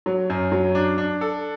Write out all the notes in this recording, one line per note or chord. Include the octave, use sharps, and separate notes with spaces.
F#3
F#2
F#3
D4
D4
A4